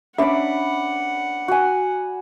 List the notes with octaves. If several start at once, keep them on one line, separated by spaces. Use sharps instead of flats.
C#4 D4 B4 D5 E5 F#5
F#4 G#5